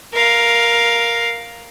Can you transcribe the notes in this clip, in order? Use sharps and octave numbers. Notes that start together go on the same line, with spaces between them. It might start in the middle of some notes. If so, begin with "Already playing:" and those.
A#4 F5